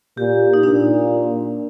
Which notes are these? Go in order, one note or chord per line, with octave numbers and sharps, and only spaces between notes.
A#2 G4
D#4
A#2 D4